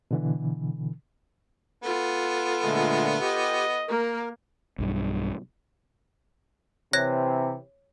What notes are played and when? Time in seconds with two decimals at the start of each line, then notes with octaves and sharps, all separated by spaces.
0.11 B2 D3 E3
1.83 B3 F4 A4
2.64 A#2 D3 G#3 A3
3.21 G4 D#5
3.88 A#3 A#4
4.79 B1 G2
6.93 C3 E3 C4 C#5 F#6 A#6